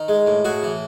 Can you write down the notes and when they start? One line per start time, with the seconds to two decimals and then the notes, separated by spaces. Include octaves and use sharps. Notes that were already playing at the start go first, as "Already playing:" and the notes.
Already playing: D#3
0.08 G#3
0.26 A2
0.45 A2 F#4 G#4
0.63 E3